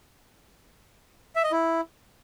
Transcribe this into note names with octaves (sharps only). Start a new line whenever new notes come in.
E5
D#5
E4